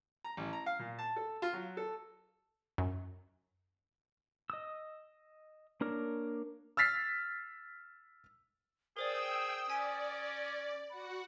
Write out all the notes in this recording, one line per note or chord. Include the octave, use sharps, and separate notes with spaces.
A#5
A1
A#5
F5
A#2
A5
A4
F4
F#3
A4
F#2
D#5 D#6 E6
A#3 D4 A#4 C#5
E6 F6 A6 B6 C7
G#4 A#4 C5 D5 G5 D#6 E6
C#4 D5 G#5 B6 D7
F#4 F#5 B5